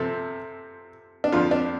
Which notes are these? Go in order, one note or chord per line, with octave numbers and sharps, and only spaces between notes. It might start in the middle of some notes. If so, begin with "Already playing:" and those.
Already playing: C3 F3 C4 A4
D4
F2 D3 F3 F4
D4